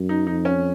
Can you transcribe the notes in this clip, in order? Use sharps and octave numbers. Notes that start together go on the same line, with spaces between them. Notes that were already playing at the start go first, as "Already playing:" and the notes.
Already playing: F#2
D#4
F2 D#4
C#4